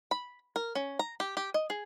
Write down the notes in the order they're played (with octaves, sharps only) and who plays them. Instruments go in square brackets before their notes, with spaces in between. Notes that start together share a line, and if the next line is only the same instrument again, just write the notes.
[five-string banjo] B5
A#4
C#4
A#5
G4
G4
D#5
G#4